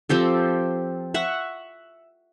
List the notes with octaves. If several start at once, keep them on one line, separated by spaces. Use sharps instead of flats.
F3 C4 G4 A4
E5 F#5 C#6